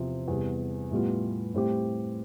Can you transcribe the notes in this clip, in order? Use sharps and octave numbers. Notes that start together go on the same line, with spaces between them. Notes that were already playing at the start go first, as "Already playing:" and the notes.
Already playing: E2 C3 F3 C4
E2 C3 G3
A2 G3 B3 F4
A2 G3 C4 G4